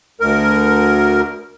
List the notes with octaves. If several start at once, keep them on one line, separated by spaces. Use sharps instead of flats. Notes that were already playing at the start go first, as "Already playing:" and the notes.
D2 A#4